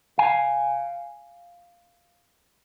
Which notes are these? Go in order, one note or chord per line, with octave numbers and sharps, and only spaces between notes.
F5 G#5